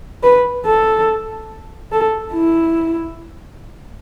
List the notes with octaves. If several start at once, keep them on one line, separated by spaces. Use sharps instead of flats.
B4
A4
A4
E4